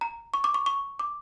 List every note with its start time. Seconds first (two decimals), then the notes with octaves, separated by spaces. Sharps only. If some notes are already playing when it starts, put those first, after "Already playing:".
0.01 A#5
0.34 C#6
0.44 D6
0.54 C#6
0.66 C#6
0.99 D6